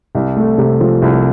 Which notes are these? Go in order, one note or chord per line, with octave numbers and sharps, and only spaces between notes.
C2
A3
C3
F3
C2